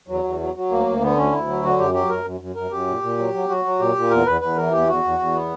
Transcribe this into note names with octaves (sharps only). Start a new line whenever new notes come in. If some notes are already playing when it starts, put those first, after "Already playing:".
E2 F#3
E2
F#3
F#3
D2 A#3
D2
D3 B3
D2 C#4
D2 E4
F#3
D3 F#4
F#2 G4
F#3 G4
F#2 A#4
F#2
F#2
F#2 A#4
F#2 G4
A#2
A#2
F#3
F#3
F#3 F#4
F#3
A#2 G4
A#2
E2 A#4
E2 B4
E2 B4
E3 A#4
E2 G4
E2 F#4
E2
E2
B3